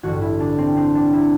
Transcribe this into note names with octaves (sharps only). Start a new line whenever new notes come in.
A1 G2 D3 F#4
E4
D4
C4
C4
D4
E4